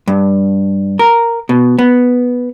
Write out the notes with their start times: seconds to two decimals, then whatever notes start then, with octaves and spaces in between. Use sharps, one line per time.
0.08 G2
0.99 A#4
1.49 B2
1.79 B3